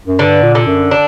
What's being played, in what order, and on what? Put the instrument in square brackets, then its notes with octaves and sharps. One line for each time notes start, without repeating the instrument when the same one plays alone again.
[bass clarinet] F#2
[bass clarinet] G2 [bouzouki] D3
[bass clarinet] A#2
[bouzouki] D3
[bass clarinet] F#2
[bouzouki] D4